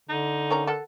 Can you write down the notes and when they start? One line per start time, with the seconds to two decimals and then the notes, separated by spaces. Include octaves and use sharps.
0.09 D3 D#4
0.50 D#3 C#4 A#5
0.67 A4 A#4 F#5